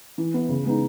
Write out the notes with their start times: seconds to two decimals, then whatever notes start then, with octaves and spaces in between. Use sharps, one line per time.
0.18 E3
0.34 B3 E4
0.49 C#3
0.65 G#3 B3 D#4